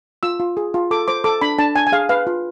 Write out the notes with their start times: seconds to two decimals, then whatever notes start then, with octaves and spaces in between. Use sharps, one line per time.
0.23 F4 E6
0.40 F4
0.57 G#4
0.74 F4
0.91 A4 D6
1.08 C5 D6
1.24 A4 D6
1.41 D4 B5
1.58 D4 A5
1.75 D4 G#5
1.87 G#5
1.92 G#4 F5
2.09 B4 F5
2.27 F4